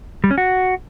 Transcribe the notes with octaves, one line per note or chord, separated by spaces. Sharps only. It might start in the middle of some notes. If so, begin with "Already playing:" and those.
G3
C#4
F#4